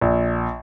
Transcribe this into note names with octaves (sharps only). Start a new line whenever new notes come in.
A#1